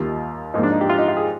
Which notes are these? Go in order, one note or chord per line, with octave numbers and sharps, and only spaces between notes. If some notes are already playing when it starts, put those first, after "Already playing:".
Already playing: D#2 D#3 G3 A#3 F4
G#2 F3 A#3 D#4
D4
D#4
G4
F4
D#4
F4
G#4